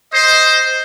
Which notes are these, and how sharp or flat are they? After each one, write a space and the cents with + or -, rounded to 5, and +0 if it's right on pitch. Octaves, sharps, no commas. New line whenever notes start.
C5 +0 D#5 +10